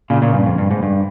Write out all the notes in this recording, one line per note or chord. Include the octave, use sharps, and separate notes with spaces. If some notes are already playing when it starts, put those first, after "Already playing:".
A#2 C#3
A#2 C#3
G2
F2
G2
G#2
G2